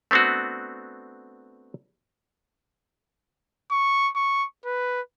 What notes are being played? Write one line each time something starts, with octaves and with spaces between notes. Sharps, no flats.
A3 B3 C4 D4 F#4
C#6
C#6
B4